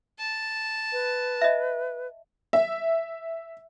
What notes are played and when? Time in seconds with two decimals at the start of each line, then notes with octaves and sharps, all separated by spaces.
0.19 A5
0.92 B4
1.41 D#5 E5
2.53 E5